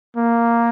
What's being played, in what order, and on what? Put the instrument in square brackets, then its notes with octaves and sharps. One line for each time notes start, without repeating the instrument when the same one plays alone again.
[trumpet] A#3